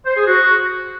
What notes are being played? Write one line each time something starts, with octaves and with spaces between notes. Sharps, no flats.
C5
G#4
F#4